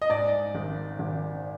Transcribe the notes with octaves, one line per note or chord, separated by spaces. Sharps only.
D#5
G#2 D5
G#1
G#1